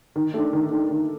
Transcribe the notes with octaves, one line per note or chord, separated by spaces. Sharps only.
D#3
A3 D4
D#3
A3 D4
D#3